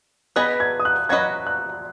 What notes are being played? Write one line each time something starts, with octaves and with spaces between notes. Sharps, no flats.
B3 G#4 B4 D#5 F#6
G#6
D#6
F#6
F#3 C#4 F#4 B4 D#5 G#6
F#6